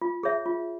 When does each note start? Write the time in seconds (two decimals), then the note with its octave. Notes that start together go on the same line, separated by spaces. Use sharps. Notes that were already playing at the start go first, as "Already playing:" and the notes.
0.02 F4
0.23 G#4 C#5 E5
0.46 F4